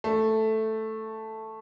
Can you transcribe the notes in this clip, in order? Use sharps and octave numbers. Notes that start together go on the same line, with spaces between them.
A3